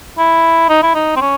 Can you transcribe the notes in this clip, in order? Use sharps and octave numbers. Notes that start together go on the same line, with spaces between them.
E4
D#4
E4
D#4
C4
C#4